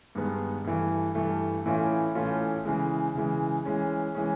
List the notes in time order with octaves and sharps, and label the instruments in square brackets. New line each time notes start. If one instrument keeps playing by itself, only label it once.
[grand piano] G2 D#3 G#3 B3
G2 E3 A3
G2 E3 A3
A2 E3 A3 C#4 F4
A2 E3 A3 C#4 F4
C#3 E3 G#3
C#3 E3 G#3
E3 G#3 C#4
E3 G#3 C#4